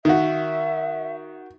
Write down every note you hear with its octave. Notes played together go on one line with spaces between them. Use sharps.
D#3 F#4 E5